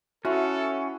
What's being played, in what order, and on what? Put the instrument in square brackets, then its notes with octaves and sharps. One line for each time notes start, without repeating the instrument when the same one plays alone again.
[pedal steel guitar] C#4 [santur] E4 F#5 C6 [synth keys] F#4 [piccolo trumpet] A4